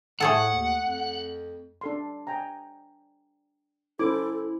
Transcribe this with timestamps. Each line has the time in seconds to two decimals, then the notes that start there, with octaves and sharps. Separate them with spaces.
0.20 A2 A3 G#4 A4 F#5
0.51 D#2
0.82 F2
1.81 D4 A4 C6
2.27 G5 G#5 A#5
3.99 C#4 E4 A4 C5 D6